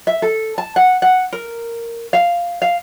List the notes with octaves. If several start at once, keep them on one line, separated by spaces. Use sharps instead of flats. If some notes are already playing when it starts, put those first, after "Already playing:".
E5
A4
A5
F#5
F#5
A#4
F5
F5